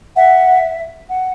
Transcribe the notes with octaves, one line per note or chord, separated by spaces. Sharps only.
E5 F#5
F#5